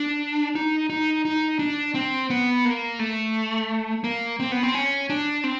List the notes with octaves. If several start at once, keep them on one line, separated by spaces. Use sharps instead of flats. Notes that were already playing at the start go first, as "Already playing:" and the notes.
Already playing: D4
D#4
D#4
D#4
D4
C4
B3
A#3
A3
A#3
C4
B3
C4
C#4
D4
C4